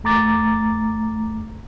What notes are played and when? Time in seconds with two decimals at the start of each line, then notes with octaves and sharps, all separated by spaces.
0.04 E2 A3 A#5 D6 A6